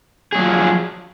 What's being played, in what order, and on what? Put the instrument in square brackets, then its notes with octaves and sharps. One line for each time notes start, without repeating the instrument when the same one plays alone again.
[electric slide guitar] G#4
F#3
F3